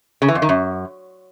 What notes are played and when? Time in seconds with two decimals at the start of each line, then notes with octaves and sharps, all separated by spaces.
0.22 C#3
0.28 E3
0.35 F2
0.42 D#3
0.49 F#2